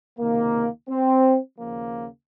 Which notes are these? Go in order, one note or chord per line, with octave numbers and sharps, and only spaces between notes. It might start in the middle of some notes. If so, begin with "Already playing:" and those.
C#2 C3 D#3 A#3
C4
D#2 C#3 F3 A#3